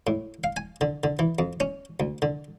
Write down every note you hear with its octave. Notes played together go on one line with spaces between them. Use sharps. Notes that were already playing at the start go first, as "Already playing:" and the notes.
A2
F5
G#5
D3
D3
E3
F2
C#4
D2
D3